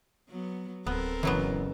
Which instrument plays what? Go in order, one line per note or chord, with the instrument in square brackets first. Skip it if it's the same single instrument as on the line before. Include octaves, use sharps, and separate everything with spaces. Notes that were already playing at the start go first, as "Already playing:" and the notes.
[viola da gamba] F#3 B3
[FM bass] D1 [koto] B3 [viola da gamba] C4 A4 A#4
[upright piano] F#1 [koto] E3 F#3 B3